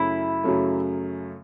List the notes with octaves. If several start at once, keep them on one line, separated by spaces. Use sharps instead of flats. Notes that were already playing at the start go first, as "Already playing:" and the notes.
Already playing: F#2 C#3 F#3 A3 E4
F#2 C#3 F#3 A3